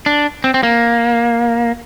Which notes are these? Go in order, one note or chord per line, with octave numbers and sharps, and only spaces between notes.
D4
C4
C4
A#3